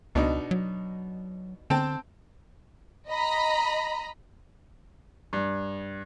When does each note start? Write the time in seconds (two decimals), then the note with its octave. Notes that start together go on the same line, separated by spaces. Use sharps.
0.15 C#2 B2 D4 D#4
0.51 F#3
1.70 D3 C4 G5 A5
3.09 D#5 A#5 B5
5.33 G2